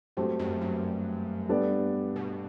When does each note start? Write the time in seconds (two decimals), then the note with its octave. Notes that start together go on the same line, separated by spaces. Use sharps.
0.17 G2 F#3 A3 C4 G4
0.39 F#2
0.61 G2
1.49 G3 B3 D4 A4 D5
2.16 B2